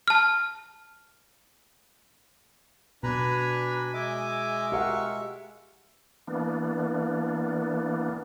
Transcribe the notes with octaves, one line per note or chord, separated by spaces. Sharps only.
A5 F6
B2 D4 B4 G#5 A#5 B5
G#3 D#5 E5 G#5 D6
G4 A#4 F5 F#5 C#6
E3 A#3 B3 D4